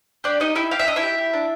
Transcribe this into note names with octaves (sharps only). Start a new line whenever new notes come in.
D4 G4 D5
D#4 G4 D#5
E4 G4 E5
G4 F5
E5
D4 D#5
E4 E5
G4
G4
D4